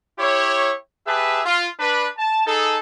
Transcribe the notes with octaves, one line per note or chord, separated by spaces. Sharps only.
E4 G4 C#5
G4 G#4 B4 E5 A5
F4
D4 B4
A5
D#4 G#4 A4